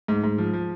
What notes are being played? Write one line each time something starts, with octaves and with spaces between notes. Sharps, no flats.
G#2
G#2
F3
F3